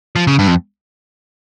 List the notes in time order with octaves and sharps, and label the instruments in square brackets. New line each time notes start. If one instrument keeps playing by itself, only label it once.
[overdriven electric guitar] F3
C#3
G2
F2